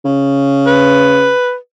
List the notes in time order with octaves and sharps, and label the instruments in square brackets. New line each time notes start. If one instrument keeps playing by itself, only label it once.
[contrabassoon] C#3
[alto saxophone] B4